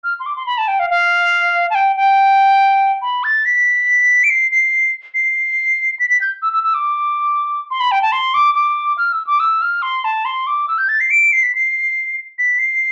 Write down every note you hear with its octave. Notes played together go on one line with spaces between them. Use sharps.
F6
C6
D6
C6
B5
A5
G5
F5
F5
A5
G5
G5
B5
A6
B6
D7
C7
C7
C7
B6
B6
G6
E6
E6
E6
D6
C6
B5
G5
A5
C6
D6
D6
F6
E6
D6
E6
F6
C6
A5
C6
D6
E6
G6
A6
C7
D7
C7
B6
C7
B6
C7